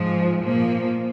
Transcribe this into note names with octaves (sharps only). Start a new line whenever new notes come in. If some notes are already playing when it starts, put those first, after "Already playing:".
Already playing: G#2 F3 G#3
A#2 F3 A#3